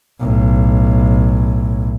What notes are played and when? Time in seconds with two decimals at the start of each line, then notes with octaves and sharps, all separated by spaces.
0.19 B1 A2